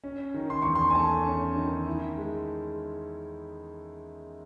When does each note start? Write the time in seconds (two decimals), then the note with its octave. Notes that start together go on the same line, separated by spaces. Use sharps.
0.04 C#4
0.34 D#3
0.50 C6
0.62 E2 C#6
0.75 C6
0.90 G#5
0.95 A3 A5
1.26 C#4
1.56 D#3
1.87 E4
2.17 G#3